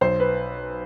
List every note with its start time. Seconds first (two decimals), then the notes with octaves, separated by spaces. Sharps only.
0.01 B1 C5
0.20 B4